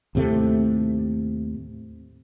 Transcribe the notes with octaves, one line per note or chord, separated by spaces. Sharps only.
D#2 A2 C3 A3